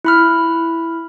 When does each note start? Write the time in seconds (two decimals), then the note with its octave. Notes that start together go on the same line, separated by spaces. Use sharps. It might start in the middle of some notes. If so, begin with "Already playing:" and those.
0.04 E4 B5 F6